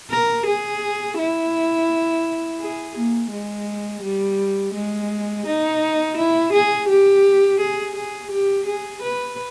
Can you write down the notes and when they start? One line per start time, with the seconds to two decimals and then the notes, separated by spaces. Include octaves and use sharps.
0.11 A#4
0.47 G#4
1.18 E4
2.60 G#4
2.96 A#3
3.32 G#3
4.03 G3
4.74 G#3
5.46 D#4
6.17 E4
6.53 G#4
6.89 G4
7.60 G#4
7.96 G#4
8.32 G4
8.66 G#4
9.02 B4